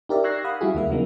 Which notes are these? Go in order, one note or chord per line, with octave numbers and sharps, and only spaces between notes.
D#4 G4 A#4 D5 E5
C#6 E6 F#6 G#6 A#6 C7
F5 F#5 B5 D#6
G3 E4 F#4 G#4
D#2 D3 A#3 E5
C#3 F#3 A#3 B3 D#4